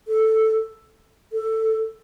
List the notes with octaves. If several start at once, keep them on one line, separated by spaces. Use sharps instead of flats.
A4
A4